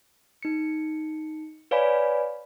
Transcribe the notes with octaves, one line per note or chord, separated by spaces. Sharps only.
D#4 C#7
B4 C#5 D5 F5 G#5 B5